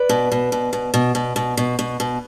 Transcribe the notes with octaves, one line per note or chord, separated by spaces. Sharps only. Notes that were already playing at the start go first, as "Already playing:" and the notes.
Already playing: B4 D5
B2
B2
B2
B2
B2
B2
B2
B2
B2
B2